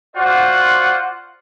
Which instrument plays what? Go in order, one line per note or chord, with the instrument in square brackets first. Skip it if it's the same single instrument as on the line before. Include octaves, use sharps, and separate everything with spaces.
[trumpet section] F4 F#4 C5 D5 F#5